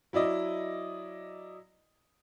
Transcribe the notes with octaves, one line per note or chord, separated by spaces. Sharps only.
F#3 E4 D5 D#5